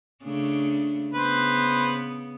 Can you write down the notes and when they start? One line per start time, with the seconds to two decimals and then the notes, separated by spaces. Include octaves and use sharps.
0.24 C#3 A3 D4
1.14 C#3 B3 B4 C5